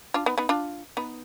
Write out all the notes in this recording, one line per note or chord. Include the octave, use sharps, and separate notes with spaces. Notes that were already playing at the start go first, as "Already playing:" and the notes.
D4 F4
B3 D#4
B3 D#4
D4 F4
B3 D#4